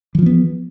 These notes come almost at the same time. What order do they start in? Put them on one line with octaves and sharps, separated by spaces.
E3 F3 C4 B3